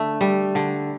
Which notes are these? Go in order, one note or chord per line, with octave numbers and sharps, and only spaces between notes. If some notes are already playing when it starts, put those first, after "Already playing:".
Already playing: D3 A3
G3
D3